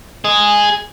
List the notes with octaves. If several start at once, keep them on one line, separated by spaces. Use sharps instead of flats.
G#4 D#5